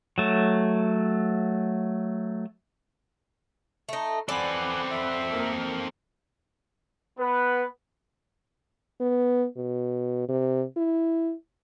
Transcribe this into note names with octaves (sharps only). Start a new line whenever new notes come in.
F#3 A3
A3 D#4
E3 C4 A4 D5 F#5 G#5 B5
E5
A#3 D#4 A#4
B3 B4
B3
B2
C3
E4